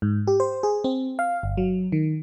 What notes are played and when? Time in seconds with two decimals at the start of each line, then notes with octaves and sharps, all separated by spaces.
0.02 G#2
0.27 G4
0.40 C5
0.63 G#4
0.84 C4
1.19 F5
1.43 G1
1.57 F#3
1.92 D#3